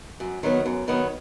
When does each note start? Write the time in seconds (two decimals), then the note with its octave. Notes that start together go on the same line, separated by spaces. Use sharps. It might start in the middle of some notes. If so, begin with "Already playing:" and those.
0.20 F#2
0.43 D#3 F#3 B3
0.66 F#2
0.88 D#3 F#3 B3